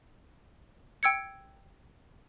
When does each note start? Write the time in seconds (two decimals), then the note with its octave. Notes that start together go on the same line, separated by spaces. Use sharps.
1.03 G5 E6 G#6 C#7